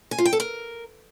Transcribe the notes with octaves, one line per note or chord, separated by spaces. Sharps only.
G#5
F4
G5
A4
A#4